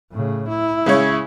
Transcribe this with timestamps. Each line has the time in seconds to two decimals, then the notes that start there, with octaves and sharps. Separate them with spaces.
0.12 A2 C#3
0.48 E4
0.86 C#3 G#3 C#5